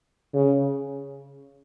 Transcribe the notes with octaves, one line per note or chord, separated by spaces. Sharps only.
C#3